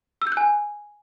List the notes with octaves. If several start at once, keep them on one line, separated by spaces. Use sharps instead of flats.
E6
G6
F#6
G#5